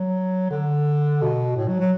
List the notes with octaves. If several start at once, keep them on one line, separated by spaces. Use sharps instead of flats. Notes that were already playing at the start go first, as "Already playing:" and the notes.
Already playing: F#3
D3
B2
A2
F#3
F#3